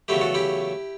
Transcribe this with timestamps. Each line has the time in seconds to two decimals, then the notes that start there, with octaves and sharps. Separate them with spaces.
0.08 E2 C#3 F#3 A3 E4 G4
0.21 F#4 A4
0.34 E4 G4